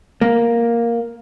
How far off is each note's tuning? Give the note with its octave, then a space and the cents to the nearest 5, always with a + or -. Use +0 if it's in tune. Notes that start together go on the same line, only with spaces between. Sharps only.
A#3 +5